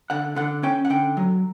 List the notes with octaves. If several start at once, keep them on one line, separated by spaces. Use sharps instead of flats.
D3 F#5
D3 F#5
C#4 G5
F#5
D3 G5
F#3